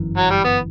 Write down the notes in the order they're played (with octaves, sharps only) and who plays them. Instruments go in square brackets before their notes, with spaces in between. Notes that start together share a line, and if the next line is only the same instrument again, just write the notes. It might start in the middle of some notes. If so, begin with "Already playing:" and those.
Already playing: [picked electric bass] G1 F#2 E3
[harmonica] F#3
G3
B3